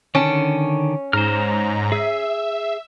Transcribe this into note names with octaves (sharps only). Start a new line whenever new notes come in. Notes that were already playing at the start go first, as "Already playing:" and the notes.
D3 D#3 C#4 A5
G#2 C5 A#5 F6
G#4 E5